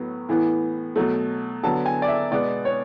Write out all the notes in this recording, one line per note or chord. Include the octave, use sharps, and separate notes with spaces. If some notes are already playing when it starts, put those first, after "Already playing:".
Already playing: A2 F#3 B3
A2 E3 B3
B2 F#3 A3
D3 F#3 B3 A5
G#5
D5
E5
B2 G#3 B3 D5
C#5